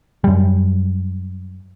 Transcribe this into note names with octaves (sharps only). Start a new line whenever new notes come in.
F#2 G3